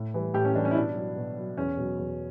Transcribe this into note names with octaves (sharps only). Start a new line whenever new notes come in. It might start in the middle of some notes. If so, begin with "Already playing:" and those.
Already playing: A2
E3 G3
A2 G4
C#4
E3 G3 D4
C#4
E4
B2 D4
F#3
B2
F#3
E2 C#4
B2 F#3
E2